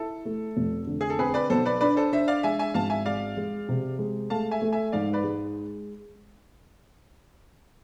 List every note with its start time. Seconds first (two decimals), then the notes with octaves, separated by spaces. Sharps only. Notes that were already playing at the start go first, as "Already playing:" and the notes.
Already playing: E4 A4
0.25 A3
0.57 F1
0.87 D3
1.01 G#4
1.10 A4
1.19 C4 G#4 B4
1.34 B4 D5
1.50 B1 A4 C5
1.66 B4 D5
1.81 D4 B4 D5
1.96 A4 C5
2.13 D4 C5 E5
2.28 D5 F5
2.43 G#3 E5 G#5
2.59 E5 G#5
2.74 G#1 F5 A5
2.90 E5 G#5
3.05 G#3 D5 F5
3.37 G#3
3.69 C3
3.99 G#3
4.30 A3 F5 A5
4.51 E5 G#5
4.62 A3
4.72 E5 G#5
4.92 G#2 D5 F5
5.13 B4 D5
5.24 G#3